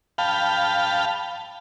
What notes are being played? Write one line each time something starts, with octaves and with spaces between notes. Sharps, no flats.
F5 G5 A5 B5